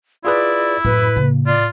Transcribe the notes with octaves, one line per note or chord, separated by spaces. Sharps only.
E4 F4 G#4 B4 D5
F#2 A2 B4
C#3 A#3
F4 D5